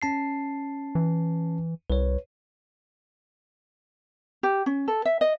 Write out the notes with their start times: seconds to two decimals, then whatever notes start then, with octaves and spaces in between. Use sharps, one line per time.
0.02 C#4 A5 C7
0.95 E3
1.90 C2 B4 C#5
4.43 G4
4.66 C#4
4.88 A4
5.05 E5
5.21 D#5